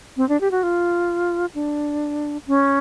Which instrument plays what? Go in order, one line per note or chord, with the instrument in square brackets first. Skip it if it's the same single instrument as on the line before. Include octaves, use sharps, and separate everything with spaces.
[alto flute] C4
D4
G4
F#4
F4
D4
C#4